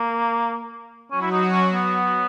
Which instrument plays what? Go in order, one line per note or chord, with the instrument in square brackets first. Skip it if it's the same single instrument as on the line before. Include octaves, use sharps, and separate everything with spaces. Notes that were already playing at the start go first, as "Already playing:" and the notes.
Already playing: [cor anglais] A#3
[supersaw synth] F#3 F#4 [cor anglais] C#4
[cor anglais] E4
D#4
C#4
B3